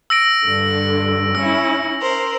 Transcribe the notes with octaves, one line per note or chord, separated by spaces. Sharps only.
E6 A#6 D7
G2 D3
C#4 E4 E6
A#4 C5